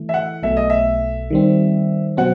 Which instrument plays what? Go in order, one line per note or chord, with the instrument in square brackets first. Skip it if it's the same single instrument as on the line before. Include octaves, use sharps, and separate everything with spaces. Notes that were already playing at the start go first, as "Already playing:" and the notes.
Already playing: [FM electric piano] E3 A3
[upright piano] E5
F#5
[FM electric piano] B1 B2 A3 [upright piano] E5
[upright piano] D#5
E5
[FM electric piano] D#3 G3 C4
[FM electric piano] B2 F#3 C4 [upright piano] F#5